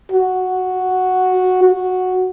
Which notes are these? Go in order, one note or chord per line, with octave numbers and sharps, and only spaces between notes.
F#4
F#4